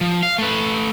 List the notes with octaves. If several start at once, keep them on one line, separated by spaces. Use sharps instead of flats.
F3
F5
A3 B4